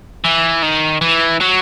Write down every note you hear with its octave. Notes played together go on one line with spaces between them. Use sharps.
E3
D#3
E3
F#3